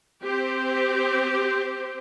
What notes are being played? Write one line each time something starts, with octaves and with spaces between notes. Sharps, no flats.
C4 G4 C5